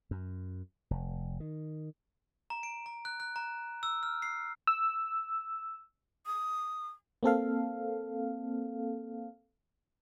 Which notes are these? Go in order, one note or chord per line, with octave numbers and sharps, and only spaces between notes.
F#2
F1
D#3
A#5
D7
A#5
F#6
F#6
A#5
E6
F6
C7
E6
D#6
A#3 C4 A4 F5